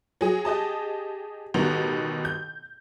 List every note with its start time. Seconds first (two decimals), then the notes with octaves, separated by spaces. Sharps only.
0.21 F#3 G#4
0.45 G4 G#4 D#5 A5
1.54 A1 B2 D#3 G3 B3 F7
2.25 G6